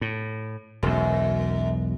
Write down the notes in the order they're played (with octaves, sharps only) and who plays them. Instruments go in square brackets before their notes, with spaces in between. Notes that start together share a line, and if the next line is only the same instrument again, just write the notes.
[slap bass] A2
[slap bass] E1 B1 [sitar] F#2